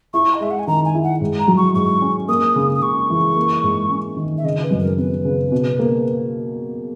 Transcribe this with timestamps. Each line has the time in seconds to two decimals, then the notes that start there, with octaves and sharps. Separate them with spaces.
0.13 E4 C#6
0.34 D#5
0.40 G#3 E5
0.50 F#5
0.59 G#5
0.67 D#3 A#5
0.85 G#5
0.95 E4
1.03 F#5
1.21 G#2
1.39 A#5
1.48 F#3
1.57 C#6
1.75 G#2 C#6
2.01 C#4
2.29 A#3 D#6
2.56 C#3
2.74 D#6
2.82 C#3 C#6
3.10 E3
3.36 A#3
3.63 G#2
3.90 C#4
4.17 D#3
4.37 E5
4.44 C#3 D#5
4.63 B4
4.71 F#2
4.80 A#4
4.98 B3 B4
5.25 C#3
5.52 B2
5.79 A#3